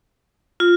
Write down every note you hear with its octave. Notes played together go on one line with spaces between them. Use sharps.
F4